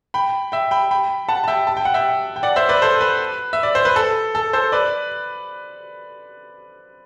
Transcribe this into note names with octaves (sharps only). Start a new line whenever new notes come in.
G5 B5
E5 G5
G5 B5
G5 B5
F#5 A5
A5
E5 G5
A5
G5
F#5
E5 G5
G5
D5 F#5
C5 E5
B4 D5
A4 C5
B4
E5
D5
C5
B4
A4
A4
A4 C5
B4 D5